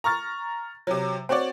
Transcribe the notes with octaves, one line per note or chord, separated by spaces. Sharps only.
A#5 C#6 F6 A6
C3 F#3
C4 F#4 C#5 D5